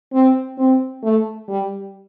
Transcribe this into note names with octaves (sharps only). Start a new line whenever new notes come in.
C4
C4
A3
G3